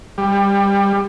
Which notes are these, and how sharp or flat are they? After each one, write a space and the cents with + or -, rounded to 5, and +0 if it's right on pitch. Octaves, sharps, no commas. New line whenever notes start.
G3 +20